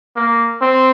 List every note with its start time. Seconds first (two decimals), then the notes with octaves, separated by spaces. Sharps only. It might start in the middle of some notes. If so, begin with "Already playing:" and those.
0.16 A#3
0.62 C4